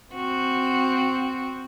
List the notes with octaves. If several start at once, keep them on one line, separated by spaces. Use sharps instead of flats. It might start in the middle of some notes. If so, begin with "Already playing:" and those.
C4 F#4